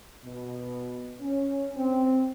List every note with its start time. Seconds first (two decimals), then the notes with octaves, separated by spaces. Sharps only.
0.24 B2
1.21 C#4
1.77 C4